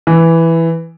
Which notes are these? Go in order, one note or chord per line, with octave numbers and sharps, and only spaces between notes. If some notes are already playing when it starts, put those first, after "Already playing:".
E3